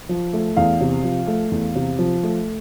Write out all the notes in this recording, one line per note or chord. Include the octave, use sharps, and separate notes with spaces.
F3
A3
E2 F5
C3
F3
A3
E2
C3
F3
A3